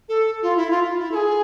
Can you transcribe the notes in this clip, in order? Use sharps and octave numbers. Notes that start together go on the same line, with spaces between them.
A4
F4
E4
F4
F4
E4
A4
G#4